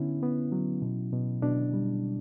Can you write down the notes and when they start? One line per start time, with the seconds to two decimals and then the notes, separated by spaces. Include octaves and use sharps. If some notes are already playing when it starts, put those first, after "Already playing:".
Already playing: D3 B3 C#4 E4
0.23 B3
0.52 F#3
0.82 B2
1.13 B2
1.42 B2 D4
1.74 G3